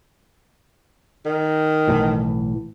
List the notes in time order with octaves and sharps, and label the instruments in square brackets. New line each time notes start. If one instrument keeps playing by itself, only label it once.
[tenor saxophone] D#3
[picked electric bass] B1 A2 E3